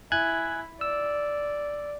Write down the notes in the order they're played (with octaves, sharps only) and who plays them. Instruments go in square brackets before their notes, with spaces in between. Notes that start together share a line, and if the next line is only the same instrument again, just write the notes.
[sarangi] E4 [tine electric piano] G#5 F#6 G#6
[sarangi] D5 [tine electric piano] E6